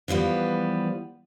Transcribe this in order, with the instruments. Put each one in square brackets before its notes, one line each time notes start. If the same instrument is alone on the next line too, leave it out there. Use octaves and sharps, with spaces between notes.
[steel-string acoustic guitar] E3 F3 G3 B3